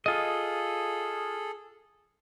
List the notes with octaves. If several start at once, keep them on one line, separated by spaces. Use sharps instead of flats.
F4 G#4 A4 D#5